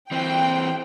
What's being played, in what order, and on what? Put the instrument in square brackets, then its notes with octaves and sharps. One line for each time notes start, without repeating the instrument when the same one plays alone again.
[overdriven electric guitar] E3 C4 [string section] G5